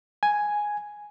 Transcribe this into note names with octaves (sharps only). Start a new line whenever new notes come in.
G#5